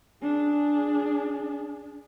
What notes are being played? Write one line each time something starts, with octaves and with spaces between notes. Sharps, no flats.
D4 G#4